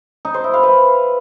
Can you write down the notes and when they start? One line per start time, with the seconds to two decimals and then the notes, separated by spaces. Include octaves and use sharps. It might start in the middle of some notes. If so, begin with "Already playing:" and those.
0.25 D#4
0.34 C5
0.44 E4
0.54 F5
0.63 B4